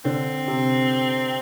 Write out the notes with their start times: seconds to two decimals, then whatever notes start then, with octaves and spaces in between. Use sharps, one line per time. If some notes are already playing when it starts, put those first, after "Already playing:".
0.05 D3 C4
0.48 C3